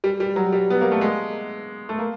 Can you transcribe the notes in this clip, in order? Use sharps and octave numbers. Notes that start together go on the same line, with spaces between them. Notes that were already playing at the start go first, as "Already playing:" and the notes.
G3
G3
F#3
G3
B3
A#3
A3
G#3
A3
A#3